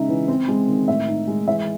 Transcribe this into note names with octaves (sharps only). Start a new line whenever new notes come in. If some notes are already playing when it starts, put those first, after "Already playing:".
Already playing: C#3 G#3 D#4 E5
E3
C4
G#3
D#3
A2 E5
D#4
G#3
E3 E5